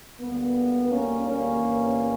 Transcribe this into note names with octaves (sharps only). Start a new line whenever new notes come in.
D2 D3 G3 A#3 B3
A#3 C#4
A#3 C#4
G1 G2 E3